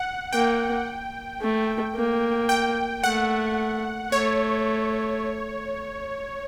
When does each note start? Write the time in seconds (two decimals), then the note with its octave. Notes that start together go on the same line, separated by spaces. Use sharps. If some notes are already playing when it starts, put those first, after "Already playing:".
Already playing: F#5
0.33 A#3 G5
1.41 A3
1.95 A#3
2.49 G5
3.03 A3 F#5
4.12 A3 C#5